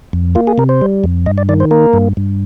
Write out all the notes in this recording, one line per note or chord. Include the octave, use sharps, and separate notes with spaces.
F2
A#3 F4
G#4
C3 A#4
C5
G3
F2
G2 D#5
D5
D#3 D5
C5
A#3 A#4
G2
G2